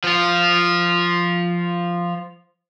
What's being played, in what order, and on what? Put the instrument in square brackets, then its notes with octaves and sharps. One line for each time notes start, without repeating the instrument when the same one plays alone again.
[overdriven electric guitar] F3 F4